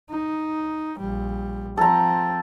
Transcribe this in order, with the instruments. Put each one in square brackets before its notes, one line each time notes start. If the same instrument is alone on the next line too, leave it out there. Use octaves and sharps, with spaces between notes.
[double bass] D#4
A#1 G3
[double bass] F3 C4 [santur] A4 A#5